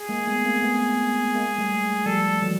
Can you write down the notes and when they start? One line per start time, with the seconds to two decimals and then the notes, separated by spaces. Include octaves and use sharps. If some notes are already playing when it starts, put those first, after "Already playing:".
Already playing: G#4
0.09 G#3 A#3
0.27 A3 B3
0.44 A#3 C4
0.62 A3 B3
1.35 G#3 A#3
1.59 G3 A3
2.06 F3 G3 A4
2.42 E3 F#3